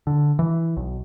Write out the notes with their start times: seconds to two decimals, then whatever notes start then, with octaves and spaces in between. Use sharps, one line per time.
0.07 D3
0.39 E3
0.77 B1